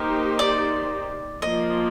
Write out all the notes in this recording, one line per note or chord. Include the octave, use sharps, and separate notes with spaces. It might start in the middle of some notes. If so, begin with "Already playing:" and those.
Already playing: A#3 D#4 G4 A#4 C5
D5
F3 A#3 F4 D#5